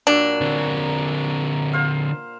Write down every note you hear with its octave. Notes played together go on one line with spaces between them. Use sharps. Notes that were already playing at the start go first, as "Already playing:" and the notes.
A#2 F#3 D4
D3 C4
C5 F5